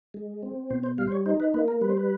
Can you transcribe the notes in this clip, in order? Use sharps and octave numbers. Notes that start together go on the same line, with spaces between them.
G#3
C4
B2 C5
C5
G3 F5
C5
C#5
D#4 C5
B4
A#3 B4
A#4
G3 B4
C5
B4